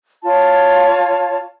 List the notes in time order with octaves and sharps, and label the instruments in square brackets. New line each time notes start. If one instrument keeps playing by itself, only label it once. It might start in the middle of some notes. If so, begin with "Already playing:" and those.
[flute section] F4 C#5 A5